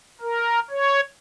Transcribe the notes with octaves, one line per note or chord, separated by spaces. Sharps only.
A#4
C#5